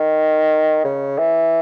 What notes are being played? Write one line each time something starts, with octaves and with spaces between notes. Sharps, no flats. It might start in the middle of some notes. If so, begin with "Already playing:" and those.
Already playing: D#3
C#3
E3